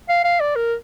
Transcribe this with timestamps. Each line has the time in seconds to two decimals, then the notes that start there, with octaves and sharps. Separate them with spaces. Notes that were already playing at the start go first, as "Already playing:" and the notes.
0.09 F5
0.24 F5
0.40 D5
0.56 A#4